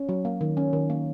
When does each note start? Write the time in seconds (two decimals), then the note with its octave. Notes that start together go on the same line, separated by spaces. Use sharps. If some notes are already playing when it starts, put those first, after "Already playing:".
Already playing: C#4
0.09 F#3
0.25 A#3
0.41 D#3
0.57 C#4
0.73 D#3
0.90 A#3